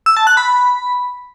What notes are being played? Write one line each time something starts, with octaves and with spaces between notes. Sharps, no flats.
E6
A5
F#6
B5